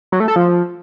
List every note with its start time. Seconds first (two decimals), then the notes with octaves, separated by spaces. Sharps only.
0.12 F#3
0.20 A3
0.28 A4
0.36 F3